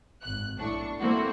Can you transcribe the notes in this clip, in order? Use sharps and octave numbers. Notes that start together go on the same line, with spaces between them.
G#1 F#6
B1 A2 D4 C#6
A#3 C4 E4 F#4 A4